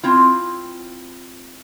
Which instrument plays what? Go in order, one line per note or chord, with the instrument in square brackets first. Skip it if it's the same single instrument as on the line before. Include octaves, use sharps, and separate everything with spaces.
[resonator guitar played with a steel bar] C4 E4 F4